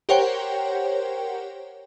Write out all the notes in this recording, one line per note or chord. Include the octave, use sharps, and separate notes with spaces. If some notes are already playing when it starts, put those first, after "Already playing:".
G4 A#4 C5 C#5 F#5 G5